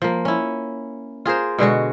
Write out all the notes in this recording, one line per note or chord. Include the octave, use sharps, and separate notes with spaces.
F3 A#3
C#4 E4
F4 G#4 A#4 C5
B2 D3 G#3 F#4